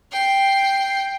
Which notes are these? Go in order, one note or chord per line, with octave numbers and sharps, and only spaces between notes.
G5 C7